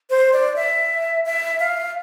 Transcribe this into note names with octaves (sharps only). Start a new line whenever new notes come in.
C5
D5
E5
E5
F5